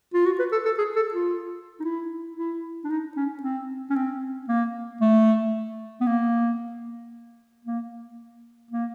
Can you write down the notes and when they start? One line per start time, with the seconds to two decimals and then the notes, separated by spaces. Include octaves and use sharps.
0.14 F4
0.26 F#4
0.39 B4
0.52 A4
0.65 A4
0.78 G#4
0.96 A4
1.14 F4
1.80 D#4
1.85 E4
2.37 E4
2.84 D4
2.90 D#4
3.16 C#4
3.43 C4
3.90 C#4
3.96 C4
4.48 A#3
5.01 A3
6.01 B3
6.07 A#3
7.65 A#3
8.71 A#3